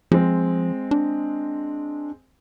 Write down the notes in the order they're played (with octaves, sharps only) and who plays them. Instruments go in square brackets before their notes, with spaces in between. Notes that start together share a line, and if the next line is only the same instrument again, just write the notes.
[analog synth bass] F3 [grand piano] G#3 C4
[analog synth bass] D4